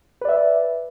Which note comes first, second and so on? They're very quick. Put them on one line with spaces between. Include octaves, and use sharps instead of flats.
B4 D5 E5